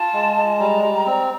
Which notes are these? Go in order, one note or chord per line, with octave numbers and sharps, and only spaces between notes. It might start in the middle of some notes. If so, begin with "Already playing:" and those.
Already playing: F4 A5
G#3
G#3
G3 A#5
G3
C4